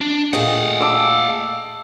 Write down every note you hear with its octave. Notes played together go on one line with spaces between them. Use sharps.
D4
A#2 A3 G#4 D#5 F5 F#5
A5 D6 E6